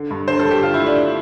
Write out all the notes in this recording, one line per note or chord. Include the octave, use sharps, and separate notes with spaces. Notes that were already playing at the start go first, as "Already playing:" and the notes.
Already playing: D3
G2
D3 C5
A4
G2
G4
D3 F4
E4
A3
D4